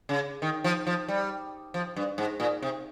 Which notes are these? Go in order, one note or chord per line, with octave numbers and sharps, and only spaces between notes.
C#3
D#3
F3
F3
G3
F3
G2
G#2
A#2
C3